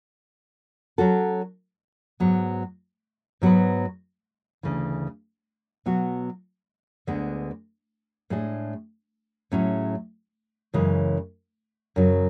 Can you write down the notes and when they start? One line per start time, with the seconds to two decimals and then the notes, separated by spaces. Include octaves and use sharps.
0.98 F#3 C#4 F#4 A4
2.20 G#2 F#3 B3
3.42 G#2 F#3 B3 F#4 B4
4.63 D2 C#3 E3
5.86 B2 F#3 B3 F#4
7.07 D2 D3 G#3 B3 D4
8.30 A2 G#3 D4 G#4
9.52 A2 F#3 C#4 E4 G#4
10.74 F#2 C#3 E3 G#3
11.96 F#2 C#3 F#3